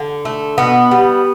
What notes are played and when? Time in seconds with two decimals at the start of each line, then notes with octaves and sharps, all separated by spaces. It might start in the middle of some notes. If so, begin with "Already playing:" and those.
Already playing: D3
0.25 A3
0.58 B2 B3
0.91 G3